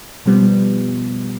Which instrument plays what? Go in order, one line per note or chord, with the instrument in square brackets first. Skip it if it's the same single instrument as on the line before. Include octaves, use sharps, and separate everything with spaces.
[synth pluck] B2 F3 G3 B3